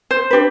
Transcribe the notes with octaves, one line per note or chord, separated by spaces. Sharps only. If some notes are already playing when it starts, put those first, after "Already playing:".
C5
D4 G4 B4